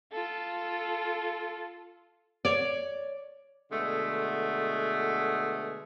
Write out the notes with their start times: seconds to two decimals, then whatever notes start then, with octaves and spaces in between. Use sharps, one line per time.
0.12 F4 A4
2.45 C#5 D5
3.71 B2 D3 G#3 A3